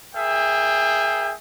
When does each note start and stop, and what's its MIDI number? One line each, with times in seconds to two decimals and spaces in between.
0.14 1.32 68
0.14 1.32 70
0.14 1.32 76
0.14 1.32 79